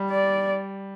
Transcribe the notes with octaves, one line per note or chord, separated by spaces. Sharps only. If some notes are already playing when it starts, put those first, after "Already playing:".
Already playing: G3
D5